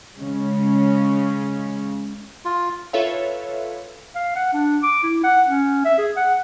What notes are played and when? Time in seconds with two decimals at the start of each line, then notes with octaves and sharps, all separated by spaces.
0.17 C#3 G#3 C#4
2.45 F4
2.93 F4 A4 B4 C#5 E5 F5
4.15 F5
4.36 F#5
4.54 D4
4.83 D6
5.04 E4
5.24 F#5
5.48 C#4
5.85 E5
5.98 G#4
6.17 F#5